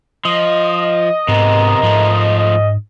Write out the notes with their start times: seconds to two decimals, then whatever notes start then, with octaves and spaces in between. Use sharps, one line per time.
0.25 F3 D#5
1.28 G#2 C3 B3 A#4
1.83 G#2 F3 A3
2.37 D#5